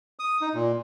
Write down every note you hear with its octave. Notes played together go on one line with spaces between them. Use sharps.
D#6
D#4
A#2